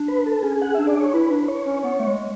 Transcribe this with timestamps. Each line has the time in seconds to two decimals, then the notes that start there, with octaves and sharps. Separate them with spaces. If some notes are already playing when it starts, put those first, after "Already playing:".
Already playing: D4
0.08 B4
0.26 A4
0.43 C#4 G#4
0.62 F#5
0.74 D4 E5
0.87 D5
1.00 C#5
1.14 E4 B4
1.31 D4
1.48 C#5
1.66 C#4
1.83 B3 C#5
2.00 A3
2.07 G#3